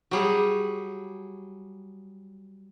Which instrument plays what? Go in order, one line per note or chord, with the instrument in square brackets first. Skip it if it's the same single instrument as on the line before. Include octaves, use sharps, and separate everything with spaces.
[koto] F#3 G3 G#4